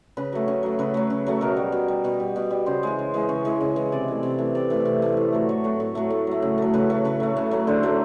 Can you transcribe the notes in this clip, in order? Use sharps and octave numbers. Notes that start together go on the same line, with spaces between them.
C#3 B4
F#3 A3
C#3
F#3 A3
C#3 B4
F#3 A3
C#3
F#3 A3
B2 A#4
G3
B2
G3
B2 B4
G3
B2
G3
C#3 C5
E3 G#3
C#3
E3 G#3
C#3 C#5
E3 G#3
C#3
E3 G#3
C3 D5
E3 A3
C3
E3 A3
C3 D5
E3 A3
C3
E3 A3
A2
F#3 A3
A2 C#5
F#3 A3
A2
F#3 A3
A2
F#3 A3
C#3
F#3 A3
C#3 B4
F#3 A3
C#3 B4
F#3 A3
C#3
F#3 A3
D3 C5
F#3 A3